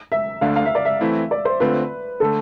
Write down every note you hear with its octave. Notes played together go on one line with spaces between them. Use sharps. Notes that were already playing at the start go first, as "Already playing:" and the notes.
E5
D2 D3 A3 D4 F5
F5
E5
D5
E5
E3 A3 C4 E4
D5
C5
D3 A3 C4 F4 B4
D3 A3 A4